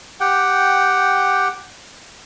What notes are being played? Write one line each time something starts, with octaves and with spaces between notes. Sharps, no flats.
G4 F#5 G5